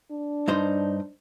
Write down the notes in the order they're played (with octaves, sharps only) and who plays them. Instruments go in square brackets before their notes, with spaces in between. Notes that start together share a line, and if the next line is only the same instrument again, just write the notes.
[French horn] D4
[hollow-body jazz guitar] G2 D#4 C5